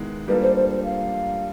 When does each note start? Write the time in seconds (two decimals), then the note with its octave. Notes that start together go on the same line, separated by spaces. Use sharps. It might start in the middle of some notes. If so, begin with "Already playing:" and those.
Already playing: D#3 G#3 B3 E4
0.28 G3 A#3 D4 F4 A4 B4
0.42 C5
0.55 C5
0.70 C5
0.84 F5